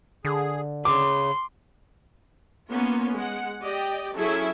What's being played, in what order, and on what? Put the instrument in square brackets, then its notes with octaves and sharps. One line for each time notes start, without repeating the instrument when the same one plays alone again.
[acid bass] D3 [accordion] G#4
[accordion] C#3 [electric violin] C6 [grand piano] D6
[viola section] A#3 B3 C#4 F4
G#3 F#5
G4 D5 D#5 G5
F#3 C#4 E4 G#4 A4 E5